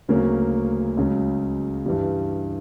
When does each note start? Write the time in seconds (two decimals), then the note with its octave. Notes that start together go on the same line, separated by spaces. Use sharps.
0.08 D2 C#3 F#3 A#3 C#4
0.97 C#2 C#3 F#3
1.86 G2 E3 G3